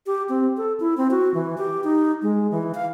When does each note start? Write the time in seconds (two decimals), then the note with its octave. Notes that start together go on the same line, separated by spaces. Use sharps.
0.06 G4
0.29 C4
0.57 A4
0.80 E4
0.97 C4
1.11 F#4
1.34 E3
1.58 G4
1.84 D#4
2.22 G#3
2.51 E3
2.75 F5